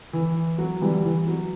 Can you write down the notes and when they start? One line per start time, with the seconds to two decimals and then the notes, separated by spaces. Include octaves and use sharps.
0.13 E3
0.58 F#3
0.81 E3 G3
1.04 E3
1.27 F#3